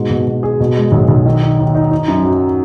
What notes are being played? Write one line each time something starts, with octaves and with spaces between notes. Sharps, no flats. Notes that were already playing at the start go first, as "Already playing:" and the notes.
Already playing: G#2 B2
B2
B2
G#4
B2
G#3
B1
B1
D#3
D#4
D#2
D#4
D#4
F#2
F#3